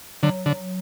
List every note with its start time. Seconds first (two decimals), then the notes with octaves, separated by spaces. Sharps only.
0.23 D3 F#3
0.46 D3